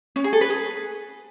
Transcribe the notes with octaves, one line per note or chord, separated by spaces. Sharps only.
C#4
G#4
A4
B4
G#4